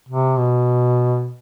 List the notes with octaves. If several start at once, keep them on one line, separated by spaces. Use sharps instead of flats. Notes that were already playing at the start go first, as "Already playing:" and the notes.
C3
B2